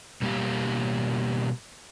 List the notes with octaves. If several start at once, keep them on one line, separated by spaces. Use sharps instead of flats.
B2 G3 A#3 G4 F5